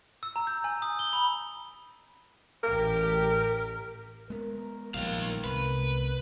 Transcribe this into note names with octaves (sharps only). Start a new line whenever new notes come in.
E6
A#5
G6
G#5
D#6
G7
B5
A1 G4 A#4
G#3 B3 A#4
A#1 D#3 G3 F5
C2 B4